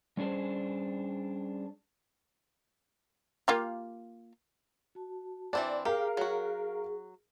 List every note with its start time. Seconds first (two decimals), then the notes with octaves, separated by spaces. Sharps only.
0.17 G3 C#4 D4 G#4 C5
3.48 A#3 F4 G4
4.95 F#4 A5
5.53 E3 C4 D4 D5
5.85 G4 G#4 A#4 F5
6.17 F#3 F#4 G#4